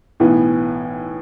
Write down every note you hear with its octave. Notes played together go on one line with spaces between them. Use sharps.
B1 A2 E3 B3